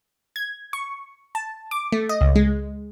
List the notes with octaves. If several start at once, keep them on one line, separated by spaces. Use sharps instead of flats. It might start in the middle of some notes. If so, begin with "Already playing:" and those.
G#6
C#6
A5
D6
A3
D#5
C#2
G#3